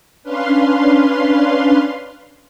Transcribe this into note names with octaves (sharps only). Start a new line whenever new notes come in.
C#4 D4 B4 F5 C6